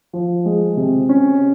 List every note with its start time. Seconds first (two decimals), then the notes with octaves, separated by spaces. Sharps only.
0.13 F3
0.46 G#3
0.77 C3
1.09 C#4